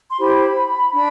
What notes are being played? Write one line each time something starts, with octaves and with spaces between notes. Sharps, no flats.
C6
E4 G4 C5 B5
D4 B5